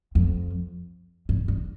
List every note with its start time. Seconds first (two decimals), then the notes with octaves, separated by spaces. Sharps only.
0.15 F2
1.29 G2
1.48 G2